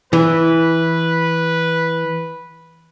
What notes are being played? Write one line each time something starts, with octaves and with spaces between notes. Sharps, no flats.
E3 B4